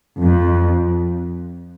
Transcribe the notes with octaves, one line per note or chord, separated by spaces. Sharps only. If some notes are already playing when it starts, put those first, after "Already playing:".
F2